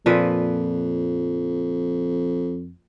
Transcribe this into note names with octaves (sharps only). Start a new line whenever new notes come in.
F2 A#2 F3 B4